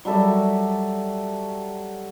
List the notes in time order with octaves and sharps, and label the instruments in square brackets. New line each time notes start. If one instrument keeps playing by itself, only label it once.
[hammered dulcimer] F#3 G3 A4 E5